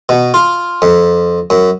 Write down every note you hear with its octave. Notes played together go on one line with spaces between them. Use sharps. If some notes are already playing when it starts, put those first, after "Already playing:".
B2
F4
F2
F#2